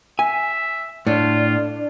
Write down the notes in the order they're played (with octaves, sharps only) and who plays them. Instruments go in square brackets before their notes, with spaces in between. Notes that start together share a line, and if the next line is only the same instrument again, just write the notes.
[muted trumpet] E5 [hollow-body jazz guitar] G#5
[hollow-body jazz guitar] A2 [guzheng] D4 [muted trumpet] F4